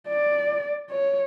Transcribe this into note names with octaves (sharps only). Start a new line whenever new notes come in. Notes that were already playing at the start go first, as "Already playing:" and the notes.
D5
C#5